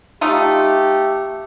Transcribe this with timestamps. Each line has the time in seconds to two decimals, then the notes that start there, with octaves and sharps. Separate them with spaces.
0.21 A3 D#4 F4 G4